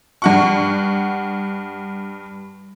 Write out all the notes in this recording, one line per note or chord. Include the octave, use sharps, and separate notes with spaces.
G2 F#5 C#6